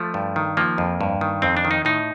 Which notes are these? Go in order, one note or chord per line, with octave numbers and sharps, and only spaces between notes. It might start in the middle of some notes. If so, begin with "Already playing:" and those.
Already playing: F3 A3
G2
D#3
F3 A#3
F2
G2
D#3
F2 C4
D4
D#3
D#4
A2 D#4